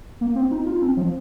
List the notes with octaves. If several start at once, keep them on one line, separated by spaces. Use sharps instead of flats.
A#3
C4
D#4
F4
C4
F3